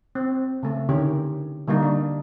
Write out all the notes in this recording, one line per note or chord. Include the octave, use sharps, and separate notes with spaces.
C4
C#3 A3
D3 D#3 C#4 G4
D3 G3 A#3 D#4
D4